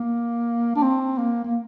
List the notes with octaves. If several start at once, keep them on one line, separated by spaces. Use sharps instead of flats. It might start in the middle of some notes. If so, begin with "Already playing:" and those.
Already playing: A#3
D4
C4
A#3
A#3